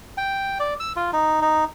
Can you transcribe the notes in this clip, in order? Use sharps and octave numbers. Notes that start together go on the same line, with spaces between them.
G5
D5
E6
F4
D#4
D#4